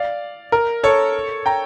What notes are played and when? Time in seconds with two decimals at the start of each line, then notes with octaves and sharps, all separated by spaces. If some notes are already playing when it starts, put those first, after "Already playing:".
Already playing: D5 F5
0.52 A#4
0.83 A4 C#5
1.46 G5 A#5